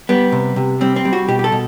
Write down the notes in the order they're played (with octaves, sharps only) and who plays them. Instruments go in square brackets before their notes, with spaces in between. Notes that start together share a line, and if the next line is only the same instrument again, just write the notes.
[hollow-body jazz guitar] G3 B3
C3
C3
G3 C4
C4
G3
F#4
B2 G4
G4
A4
B2